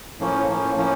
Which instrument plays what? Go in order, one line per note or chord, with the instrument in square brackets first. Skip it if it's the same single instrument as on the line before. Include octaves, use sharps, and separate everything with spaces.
[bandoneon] A2 F3 A#3 C#4
A2 F3 A#3 C#4
A2 F3 A#3 C#4